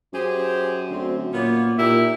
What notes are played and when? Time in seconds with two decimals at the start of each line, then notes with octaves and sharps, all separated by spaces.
0.13 F#2 G4 G#4 C5
0.90 D2 C4
1.32 A#2 A#3 B3 F4 C#5
1.78 A#2 D#4 E4 G4 E5